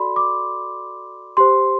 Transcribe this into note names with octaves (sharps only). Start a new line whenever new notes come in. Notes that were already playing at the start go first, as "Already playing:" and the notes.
Already playing: F#4 A4 D5 B5 C6
D6
G4 C5 C6